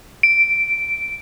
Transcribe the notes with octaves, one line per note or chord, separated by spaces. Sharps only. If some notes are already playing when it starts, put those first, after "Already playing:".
D7